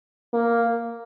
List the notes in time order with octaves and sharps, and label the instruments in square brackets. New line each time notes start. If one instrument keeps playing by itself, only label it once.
[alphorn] A#3